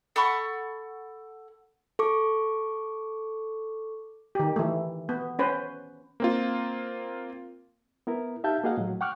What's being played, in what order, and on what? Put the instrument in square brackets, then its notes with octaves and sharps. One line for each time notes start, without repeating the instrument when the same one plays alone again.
[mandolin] A4 F#5 B5 C#6
[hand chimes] A4 C#6 D6
[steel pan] D#3 G4
E3 A3
B3
C#4 B4 C5
[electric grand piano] A#3 C4 F4
[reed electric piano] B3 E4 A#4
D#4 G4 E5 F5 A5 G6
A#3 F#4 G#4 D#5 F5 F#5
A2 F#3
F#5 G5 C#6 D6 F6 F#6